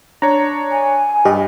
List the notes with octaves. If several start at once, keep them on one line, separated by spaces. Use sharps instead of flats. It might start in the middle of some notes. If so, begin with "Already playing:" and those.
D4 C#5 A#5
G#5
G2 G4 D#5